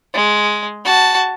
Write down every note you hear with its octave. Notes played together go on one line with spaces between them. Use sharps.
G#3
F#4 A5